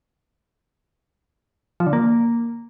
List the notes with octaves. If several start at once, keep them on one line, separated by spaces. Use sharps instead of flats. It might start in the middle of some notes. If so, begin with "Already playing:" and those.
F3
D3
A#3